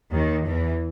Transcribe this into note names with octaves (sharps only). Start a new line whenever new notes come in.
D#2 D#3
E2 E3